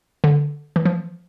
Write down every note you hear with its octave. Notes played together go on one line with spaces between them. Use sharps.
D3
E3
F3